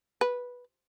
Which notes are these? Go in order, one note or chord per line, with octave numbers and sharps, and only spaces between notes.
B4